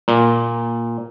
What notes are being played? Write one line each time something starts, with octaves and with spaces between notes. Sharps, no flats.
A#2